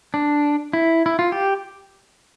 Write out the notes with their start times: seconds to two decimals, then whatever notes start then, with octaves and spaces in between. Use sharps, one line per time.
0.14 D4
0.73 E4
1.06 E4
1.19 F4
1.32 G4